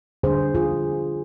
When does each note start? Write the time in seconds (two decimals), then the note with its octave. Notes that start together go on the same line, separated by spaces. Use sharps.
0.23 D3 G3 A#3 D4 G#4 C5
0.55 F4 G#4